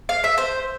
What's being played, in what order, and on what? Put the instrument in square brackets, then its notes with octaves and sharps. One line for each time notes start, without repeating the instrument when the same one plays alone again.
[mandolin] F5
E5
C5